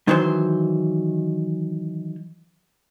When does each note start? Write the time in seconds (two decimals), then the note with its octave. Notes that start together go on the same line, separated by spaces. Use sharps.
0.08 D#3 E3 F#3 C5